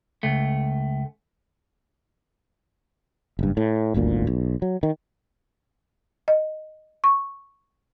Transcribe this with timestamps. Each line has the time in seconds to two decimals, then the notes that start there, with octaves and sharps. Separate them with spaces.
0.23 C#2 A3
3.39 F#1 G2
3.57 A2
3.94 D#1 G#1 D2 A#2
4.27 B1
4.62 F#3
4.83 D#3
6.28 D#5
7.04 C#6